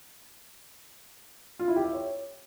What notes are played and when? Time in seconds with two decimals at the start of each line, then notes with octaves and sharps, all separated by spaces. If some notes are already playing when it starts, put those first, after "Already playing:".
1.59 F4
1.68 E4
1.76 G4
1.85 E5
1.93 C#5